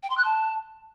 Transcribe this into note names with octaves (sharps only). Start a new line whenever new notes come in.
G5
C6
F#6
A5